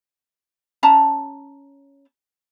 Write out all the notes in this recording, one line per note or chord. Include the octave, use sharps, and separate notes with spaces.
C#4 A5 A#5